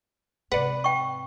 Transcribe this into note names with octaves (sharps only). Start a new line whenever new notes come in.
G#2 C3 B4 D5 F#5
G5 C#6